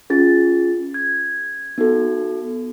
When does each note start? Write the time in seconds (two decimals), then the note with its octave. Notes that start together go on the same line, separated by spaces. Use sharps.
0.10 C#4 F4 G#4 A6
0.94 G#6
1.78 B3 D#4 F#4 A4